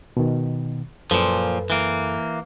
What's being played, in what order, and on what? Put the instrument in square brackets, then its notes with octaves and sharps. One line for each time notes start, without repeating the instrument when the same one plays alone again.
[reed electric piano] B2 D#3
[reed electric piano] F#2 A4 B4 [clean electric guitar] A#2 F3
[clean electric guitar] E3 A#3